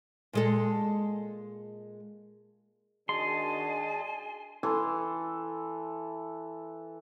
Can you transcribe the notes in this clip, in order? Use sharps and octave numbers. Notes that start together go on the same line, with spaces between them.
A#2 G#3 A4
D#3 D4 F#4 G#4 D#5 G#5 A5 C6
E3 A4 C6